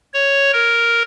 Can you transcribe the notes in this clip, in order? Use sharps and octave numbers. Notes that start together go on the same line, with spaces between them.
C#5
A#4